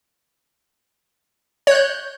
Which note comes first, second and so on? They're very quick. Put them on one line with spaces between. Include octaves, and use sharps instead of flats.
C#5 F#6 G6